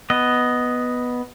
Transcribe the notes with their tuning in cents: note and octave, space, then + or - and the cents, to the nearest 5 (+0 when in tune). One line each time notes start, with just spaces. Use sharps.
B3 +0 D#5 +0